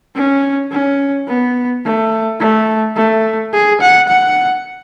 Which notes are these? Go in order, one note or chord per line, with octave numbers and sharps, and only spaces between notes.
C#4
C#4
B3
A3
A3
A3
G#4
F#5
F#5